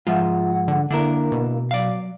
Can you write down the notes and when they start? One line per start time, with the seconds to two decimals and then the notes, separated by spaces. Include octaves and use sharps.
0.07 G#2 F3 F4 E5 F#5
0.68 D3
0.91 D3 A#3 D4 E4 A#4
1.32 B2
1.71 F#3 D5 F5